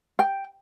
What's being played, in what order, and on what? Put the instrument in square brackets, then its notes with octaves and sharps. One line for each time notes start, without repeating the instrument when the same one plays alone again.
[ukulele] G5